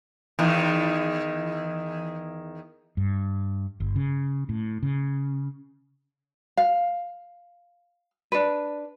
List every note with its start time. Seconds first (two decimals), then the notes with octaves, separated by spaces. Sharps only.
0.39 E2 D#3
2.97 G2
3.80 G1
3.96 C#3
4.49 A2
4.83 C#3
6.57 F5
8.32 D4 B4